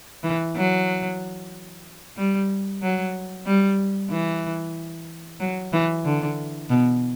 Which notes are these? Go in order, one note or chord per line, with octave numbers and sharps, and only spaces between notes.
E3
F#3
G3
F#3
G3
E3
F#3
E3
D3
B2